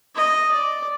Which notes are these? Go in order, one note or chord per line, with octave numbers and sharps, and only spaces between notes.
D#5
D5